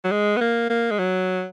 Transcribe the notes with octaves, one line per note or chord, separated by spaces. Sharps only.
F#3
G#3
B3
A#3
A#3
G#3
F#3